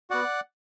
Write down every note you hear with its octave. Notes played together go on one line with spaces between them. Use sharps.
B3 F#4 D5 F#5